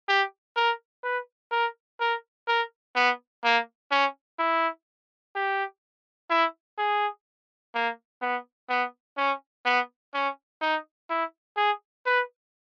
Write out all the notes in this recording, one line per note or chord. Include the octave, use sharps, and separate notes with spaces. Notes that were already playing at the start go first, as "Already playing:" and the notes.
G4
A#4
B4
A#4
A#4
A#4
B3
A#3
C#4
E4
G4
E4
G#4
A#3
B3
B3
C#4
B3
C#4
D#4
E4
G#4
B4